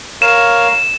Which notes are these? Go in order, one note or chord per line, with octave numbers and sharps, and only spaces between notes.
A#4 C#5 F5 E7